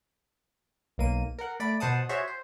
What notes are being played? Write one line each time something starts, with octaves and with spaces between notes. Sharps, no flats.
B1 A#3 D#7
A#4 F#5
A3 D5 B5 D7
B2 C5 F#5 A5 D#6
F#4 G#4 C5 C#5 E5
C5